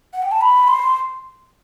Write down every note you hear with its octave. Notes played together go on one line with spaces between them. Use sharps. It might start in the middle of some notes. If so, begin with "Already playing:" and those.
F#5
G5
A5
B5
C6